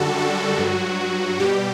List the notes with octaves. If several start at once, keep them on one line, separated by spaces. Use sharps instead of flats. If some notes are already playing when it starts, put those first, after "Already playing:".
Already playing: F#2 D3 G3 F#4 A4
F#4
G2 F#3
B2 G3 G4